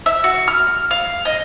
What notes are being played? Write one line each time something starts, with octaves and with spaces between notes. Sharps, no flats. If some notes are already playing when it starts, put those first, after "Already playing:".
E5
F#4
F6
F5
D#5